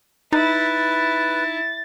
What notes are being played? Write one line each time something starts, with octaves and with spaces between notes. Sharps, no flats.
D#4 E4 B4 A6